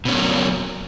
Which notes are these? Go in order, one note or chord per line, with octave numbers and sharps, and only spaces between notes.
B2 F#3 A#3 C#4